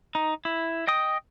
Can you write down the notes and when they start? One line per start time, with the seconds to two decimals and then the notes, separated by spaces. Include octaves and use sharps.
0.15 D#4
0.45 E4
0.87 D#5 G5 D#6